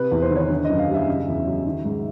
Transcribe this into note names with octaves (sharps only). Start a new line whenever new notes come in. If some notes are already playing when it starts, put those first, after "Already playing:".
Already playing: C3 B4
E2
C5
D#3
C#5
D3
F#2 D#5
F5
G3 E5
C#3
E2
F#3
D#3
G#2